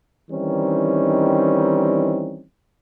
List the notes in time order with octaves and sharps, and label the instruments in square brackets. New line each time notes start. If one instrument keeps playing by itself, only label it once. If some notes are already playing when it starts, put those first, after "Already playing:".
[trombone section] D#3 E3 G3 C4 C#4 D#4